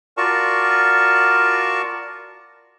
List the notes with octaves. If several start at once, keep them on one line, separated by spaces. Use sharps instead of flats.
F4 F#4 A#4 D5 A5 C#6